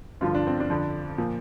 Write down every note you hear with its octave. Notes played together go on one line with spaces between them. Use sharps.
G2 D3 F3 F4
D4
C4
D4
F2 D3 F3
A#2 F3